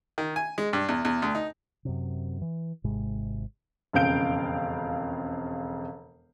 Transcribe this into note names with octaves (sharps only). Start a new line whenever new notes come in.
D#3
G#5
G#3
G2
E2
E2
D2
D#4
F#2 C3
E3
G#1 G#2 C3 G#3
E1 F2 C#3 F5 G6 D7